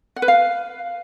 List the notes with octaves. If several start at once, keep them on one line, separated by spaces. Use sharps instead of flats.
F#5
B4
F5